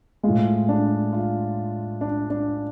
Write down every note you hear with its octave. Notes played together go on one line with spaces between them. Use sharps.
A2 G#3 F4
D4
F4
D4
D4